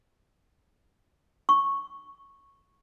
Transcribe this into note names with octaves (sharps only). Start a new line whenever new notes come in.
C#6